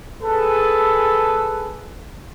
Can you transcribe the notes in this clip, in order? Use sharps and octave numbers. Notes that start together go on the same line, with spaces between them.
G#4 A4 B4